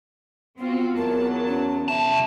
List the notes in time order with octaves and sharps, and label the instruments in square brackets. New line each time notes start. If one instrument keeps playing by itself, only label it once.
[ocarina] B3 [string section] C4 F4 F#4
[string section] E2 F#3 A5 [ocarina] A#4
[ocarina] C#4
[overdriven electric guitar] C2 A5 [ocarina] E5